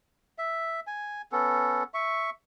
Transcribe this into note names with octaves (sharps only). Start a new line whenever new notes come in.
E5
G#5
B3 C#4 A4
E5 C#6